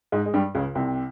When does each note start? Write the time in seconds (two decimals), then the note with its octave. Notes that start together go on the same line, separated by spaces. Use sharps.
0.12 G#2 G#3
0.26 G#3
0.34 G2 G3
0.55 C#2 C#3
0.75 C2 C3